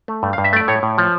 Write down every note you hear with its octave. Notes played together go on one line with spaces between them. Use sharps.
A3
G2
G2 F5
E5
A3 D5
A2 C#5
A2
F3